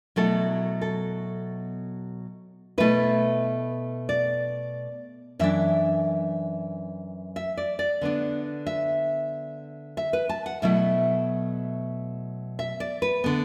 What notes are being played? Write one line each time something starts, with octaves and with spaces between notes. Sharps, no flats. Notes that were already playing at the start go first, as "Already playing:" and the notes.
B2 F#3 A3 E4 A4
A4
B2 A3 E4 B4
D5
F#2 E3 D4 E5
E5
D5
D5
D3 B3 D4
E5
E5
B4
A5
F#5
B2 F#3 A3 E4 E5
E5
D5
B4
D3 B3